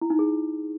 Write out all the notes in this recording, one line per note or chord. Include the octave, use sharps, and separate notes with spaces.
E4
D#4
G#4